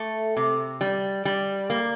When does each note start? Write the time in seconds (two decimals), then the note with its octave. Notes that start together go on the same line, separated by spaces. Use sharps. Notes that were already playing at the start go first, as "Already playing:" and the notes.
Already playing: A3
0.37 C3
0.81 G3
1.25 G3
1.70 A#3